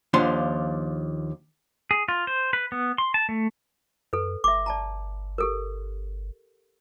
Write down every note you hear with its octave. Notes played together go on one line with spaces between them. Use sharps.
D#2 F3 D4 F4 F#5 C6
G#4
F4
C5
B4
B3
C6
A5
A3
F#2 A4 B4
G1 E5 D6
D5 A5 A#5
G4 A4 A#4